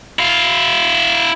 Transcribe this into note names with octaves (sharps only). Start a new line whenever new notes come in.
E4 F5